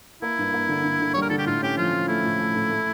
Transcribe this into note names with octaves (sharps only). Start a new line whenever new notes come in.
A#3 E4
G2
A#3
D3
D3
D3
G3 C#5
A#4
D3 A4
G4
A2 F4
C#4 G4
F3 F4
F3
A3 E4
A2
A3
A2
A3